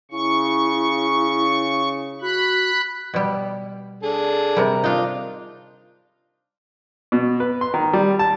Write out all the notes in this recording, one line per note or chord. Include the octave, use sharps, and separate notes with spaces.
C#3 E4 C#6
F#4 B5 F#6
B2 G3
D4 G#4 A4
C3 G3 A#4
D4 D#4 F4
B2
B4
C6
D#3
G3
A5